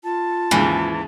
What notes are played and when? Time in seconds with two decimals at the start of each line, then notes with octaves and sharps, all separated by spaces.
0.04 F4 A5
0.51 D#2 G#2 C#3 E3